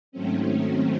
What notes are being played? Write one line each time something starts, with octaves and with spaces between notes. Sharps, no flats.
G#2 D#3 F#3 A3 C4 C#4
C#4